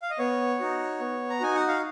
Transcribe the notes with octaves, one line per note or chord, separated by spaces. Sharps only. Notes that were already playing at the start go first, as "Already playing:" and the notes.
F5
D#5
B3 C#5
D#4 F#4
B3
A#5
D#4 F#4 G#5
F#5
F5